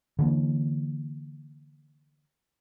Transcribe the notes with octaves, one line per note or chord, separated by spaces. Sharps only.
D3 E3 A#3